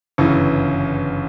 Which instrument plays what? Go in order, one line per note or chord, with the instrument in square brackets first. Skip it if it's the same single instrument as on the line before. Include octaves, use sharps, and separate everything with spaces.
[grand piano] G1 F#2 C#3 E3